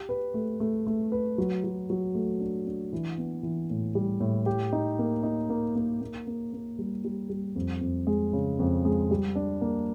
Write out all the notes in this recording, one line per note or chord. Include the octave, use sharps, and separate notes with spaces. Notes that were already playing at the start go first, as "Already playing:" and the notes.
Already playing: G4
B4
A3
A3
A3
B4
F#3
F#3
F#3
A3
D4
D4
E3
B3
E3
A2
G3
A2
G4
D#4
A#3
D#4
A#3
A#3
A#3
A#3
A#3
G3
G3
G3
F2
F2
G#3
C#3
F2
G#3
G3
D4
A#3